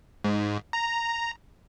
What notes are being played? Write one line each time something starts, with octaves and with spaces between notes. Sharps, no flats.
G#2
A#5